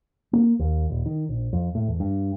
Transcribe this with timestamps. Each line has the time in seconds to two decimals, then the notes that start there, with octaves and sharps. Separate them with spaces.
0.33 A#3
0.59 D#2
0.90 D#1
1.06 D#3
1.29 A#1
1.53 F2
1.75 A2
1.88 E2
2.00 G2